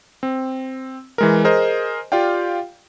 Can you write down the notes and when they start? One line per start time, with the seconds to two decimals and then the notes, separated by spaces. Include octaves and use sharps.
0.23 C4
1.18 E3 G#3 A#4
1.44 G#4 A#4 C5 D#5
2.12 F4 G4 D5 F5 G5